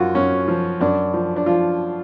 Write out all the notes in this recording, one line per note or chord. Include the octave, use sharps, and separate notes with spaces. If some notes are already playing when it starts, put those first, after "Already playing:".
Already playing: F#2 F3 F4 F#4
F#2 C#4
F3
F#2 D4
F3
D4
F3 F4